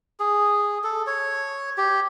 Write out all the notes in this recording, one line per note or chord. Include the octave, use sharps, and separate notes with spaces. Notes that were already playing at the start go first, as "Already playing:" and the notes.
G#4
A4
C#5
G4